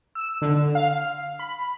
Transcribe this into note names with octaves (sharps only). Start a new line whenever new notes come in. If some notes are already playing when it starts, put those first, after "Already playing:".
E6
D3
F5
B5